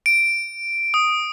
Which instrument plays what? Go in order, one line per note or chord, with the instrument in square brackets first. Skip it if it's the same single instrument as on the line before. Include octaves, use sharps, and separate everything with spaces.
[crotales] D7
D#6